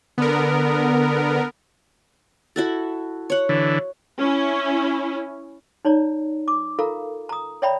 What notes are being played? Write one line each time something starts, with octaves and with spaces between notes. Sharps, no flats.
D3 B3 A#4
E4 F#4 A4
C#5 F#5
D3 E3
C#4 E4
D#4 C#5 D5 A#5
D6
F4 A4 A#4 F5 A#5
A#5 D#6
C#5 D5 E5 G5 A#5 B5